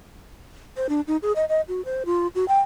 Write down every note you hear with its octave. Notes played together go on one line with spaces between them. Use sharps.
C5
D4
D#4
G#4
D#5
D#5
F#4
C5
F4
F#4
G5